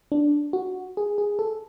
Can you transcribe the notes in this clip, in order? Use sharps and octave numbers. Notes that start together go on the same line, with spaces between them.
D4
F#4
G#4
G#4
A4